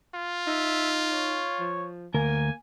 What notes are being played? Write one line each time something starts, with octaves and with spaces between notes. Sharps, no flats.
F4
D#4 E5
C#5
F3
D2 A#3 A#4 G#5